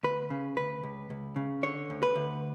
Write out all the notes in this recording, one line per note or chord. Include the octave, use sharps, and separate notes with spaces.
D2 B4
C#3
D2 B4
C#2
C#2
C#3
D3 C#5
D2
B4
D2